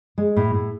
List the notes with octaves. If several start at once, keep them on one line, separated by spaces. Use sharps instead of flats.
G#3
A2
A2